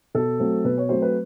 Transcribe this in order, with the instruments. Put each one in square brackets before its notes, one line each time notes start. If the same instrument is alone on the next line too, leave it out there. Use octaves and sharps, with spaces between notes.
[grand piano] B2 A4
F#3 A3 C4
B2 B4
C#5
F#3 A3 C4 C5
B4